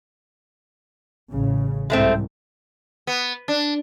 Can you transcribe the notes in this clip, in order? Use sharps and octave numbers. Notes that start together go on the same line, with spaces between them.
A1 C#3
C2 G#2 G#3 A3 C4
B3
D4